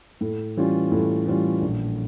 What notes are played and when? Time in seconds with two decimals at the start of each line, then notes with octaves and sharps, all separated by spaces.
0.21 A2
0.57 E3 G3 C#4 F4
0.92 A2
1.27 E3 G3 C#4 F4
1.62 A#1